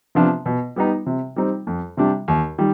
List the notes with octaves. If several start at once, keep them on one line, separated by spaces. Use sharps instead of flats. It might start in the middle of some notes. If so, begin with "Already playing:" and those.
C3 F3 B3 D4
B2
G3 B3 D#4
C3
G3 C4 D#4
F2
C3 G3 D4 G4
D#2
D#3 G3